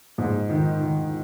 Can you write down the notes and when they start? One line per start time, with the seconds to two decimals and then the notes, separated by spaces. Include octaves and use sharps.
0.18 G#2
0.49 D#3
0.80 D#3